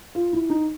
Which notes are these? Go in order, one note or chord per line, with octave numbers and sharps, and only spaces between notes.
F4
E4
D#4